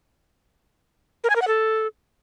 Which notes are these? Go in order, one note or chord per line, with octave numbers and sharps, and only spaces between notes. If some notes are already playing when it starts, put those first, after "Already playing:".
A#4
G#5
A#4
F#5
A4